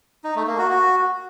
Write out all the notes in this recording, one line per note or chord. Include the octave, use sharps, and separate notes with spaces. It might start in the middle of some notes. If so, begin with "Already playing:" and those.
D#4
A3
A#3
F#4
F#4